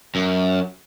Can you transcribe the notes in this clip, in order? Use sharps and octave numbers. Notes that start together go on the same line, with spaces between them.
F#2